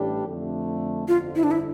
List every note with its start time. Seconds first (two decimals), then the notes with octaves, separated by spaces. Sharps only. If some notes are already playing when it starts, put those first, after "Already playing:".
Already playing: A1 A2 G3 D4 G4
0.26 F2 D3 A3
1.08 G1 F2 D3 F4
1.36 E4
1.43 D4
1.51 E4